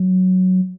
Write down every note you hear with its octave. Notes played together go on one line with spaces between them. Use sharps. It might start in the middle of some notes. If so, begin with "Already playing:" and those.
Already playing: F#3